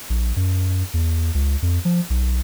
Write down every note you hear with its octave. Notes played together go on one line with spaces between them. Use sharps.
A#1
F#2
E2
C#2
F2
F3
B1